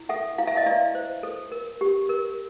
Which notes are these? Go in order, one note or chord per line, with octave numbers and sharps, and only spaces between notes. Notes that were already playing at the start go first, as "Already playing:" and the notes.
Already playing: E4
A4 E5 F#5
E4 F5
E5
D#5 F5
E4 D5 E5
C5
A4
A#4
G4
A#4